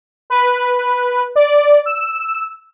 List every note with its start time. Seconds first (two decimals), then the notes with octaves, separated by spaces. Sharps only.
0.30 B4
1.36 D5
1.86 E6